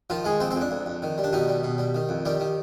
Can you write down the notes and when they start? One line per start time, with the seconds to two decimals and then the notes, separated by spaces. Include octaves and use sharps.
0.10 D#3 F3 F4
0.24 D#3 G#3 G#4
0.40 F2 C4 C5
0.51 F2 C4 C5
0.61 D4
0.71 F2
0.86 F2
1.02 D#3
1.18 G3
1.24 D4
1.33 B2 D#3 D#4
1.48 G3
1.64 B2
1.78 G3
1.95 D#3
2.09 F2
2.25 D#3 G3 G4
2.40 D#3